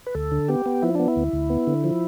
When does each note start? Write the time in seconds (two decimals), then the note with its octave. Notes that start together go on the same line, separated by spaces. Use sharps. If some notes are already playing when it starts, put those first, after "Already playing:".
0.07 B4
0.15 D2 A4
0.32 D3
0.48 B3 G4
0.66 B3
0.82 F3 E4
0.95 B3 D4
1.08 E4
1.16 D2
1.33 D2
1.50 B3
1.67 D3
1.84 F3